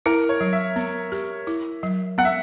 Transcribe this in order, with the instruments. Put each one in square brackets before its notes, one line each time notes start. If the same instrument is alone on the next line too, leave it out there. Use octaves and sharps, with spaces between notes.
[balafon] E4 [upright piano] A#4
[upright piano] C#5
[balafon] F#3
[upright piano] E5
[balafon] B3
G4
E4
F#3
[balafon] B3 [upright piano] F#5
[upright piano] E5